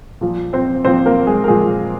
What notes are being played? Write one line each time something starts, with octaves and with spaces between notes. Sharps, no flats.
A#2 F3
C4 C5
A#2 F3 C4 C5
A#3 A#4
G#3 G#4
A#4
A#2 F3 G#3 G#4